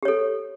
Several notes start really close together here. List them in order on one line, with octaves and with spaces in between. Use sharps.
G4 C#5 A4